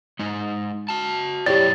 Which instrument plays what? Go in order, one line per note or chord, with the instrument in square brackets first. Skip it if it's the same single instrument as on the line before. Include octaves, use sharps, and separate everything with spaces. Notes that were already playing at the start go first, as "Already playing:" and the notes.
[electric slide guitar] G#3 D#4
F#4 A5
[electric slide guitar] F#2 E4 G5 [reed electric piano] G4 C#5 D5 [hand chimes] A6